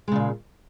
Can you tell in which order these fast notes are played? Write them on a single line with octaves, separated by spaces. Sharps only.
G#3 C#3 A#2